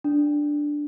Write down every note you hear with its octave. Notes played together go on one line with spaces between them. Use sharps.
D4